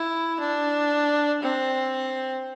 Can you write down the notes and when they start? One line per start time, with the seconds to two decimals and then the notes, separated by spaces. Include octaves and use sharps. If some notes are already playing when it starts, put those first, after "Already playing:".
Already playing: E4
0.40 D4
1.42 C4